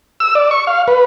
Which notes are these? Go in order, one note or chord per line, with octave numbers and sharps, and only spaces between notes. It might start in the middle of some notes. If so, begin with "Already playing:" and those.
E6
D5
C#6
F5
B4